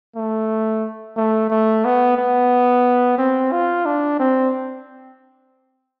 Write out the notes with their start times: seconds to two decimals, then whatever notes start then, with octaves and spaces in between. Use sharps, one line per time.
0.16 A3
1.17 A3
1.50 A3
1.85 B3
2.18 B3
3.18 C4
3.52 F4
3.86 D4
4.20 C4